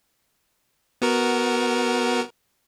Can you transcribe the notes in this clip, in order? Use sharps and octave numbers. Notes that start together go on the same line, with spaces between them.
B3 F#4 A#4